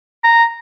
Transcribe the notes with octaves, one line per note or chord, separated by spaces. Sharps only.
A#5